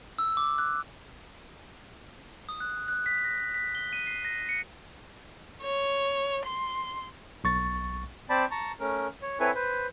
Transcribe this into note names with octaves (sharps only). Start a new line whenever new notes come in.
E6
D6
F#6
D#6
F#6
F#6
B6
A#6
B6
G7
D#7
C7
A#6
C#7
C#5
C6
B1 C#6 A6
C4 C5 D5 A5 B5
A5 A#5 C#6
A3 C#4 A#4
C#5
C4 E4 A4 B4 C#5 G#5
B4 C5